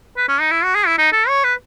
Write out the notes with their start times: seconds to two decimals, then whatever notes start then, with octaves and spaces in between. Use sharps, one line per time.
0.17 B4
0.28 C#4
0.40 D#4
0.51 E4
0.64 F#4
0.75 G#4
0.87 E4
0.98 D#4
1.13 A4
1.28 C#5
1.44 B4